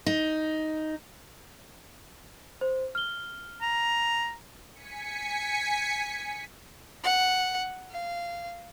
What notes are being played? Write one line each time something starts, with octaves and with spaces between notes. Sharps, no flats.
D#4
C5
F6 G7
A#5
G#5 B6 C#7
F#5
F5